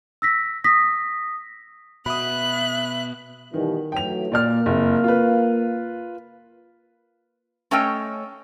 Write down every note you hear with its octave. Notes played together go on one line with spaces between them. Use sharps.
E6 A#6 B6
D#6 A#6 B6
B2 E5 B5 D#6 F#6
B2 D#3 E3 G3
E3 F#3 A3 G5 F7
A#2 A#3 D5 F6
F#1 F2
F4 B4
A3 C#4 A4 C#5 D#5 G5